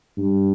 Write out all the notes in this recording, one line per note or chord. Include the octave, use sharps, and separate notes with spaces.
G2